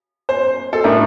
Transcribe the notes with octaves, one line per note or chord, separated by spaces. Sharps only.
C5
A4
A2 A3 D4 A#4